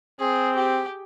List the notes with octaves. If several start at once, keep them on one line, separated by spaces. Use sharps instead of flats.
C4 G#4
G4